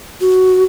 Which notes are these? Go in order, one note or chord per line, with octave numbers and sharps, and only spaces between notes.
F#4